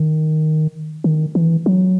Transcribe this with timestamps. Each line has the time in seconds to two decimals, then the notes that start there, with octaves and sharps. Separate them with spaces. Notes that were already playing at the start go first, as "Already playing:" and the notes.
Already playing: D#3
1.04 D#3
1.35 E3
1.66 F#3